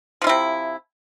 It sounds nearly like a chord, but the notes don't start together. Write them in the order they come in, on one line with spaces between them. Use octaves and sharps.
F3 F4 E4 C3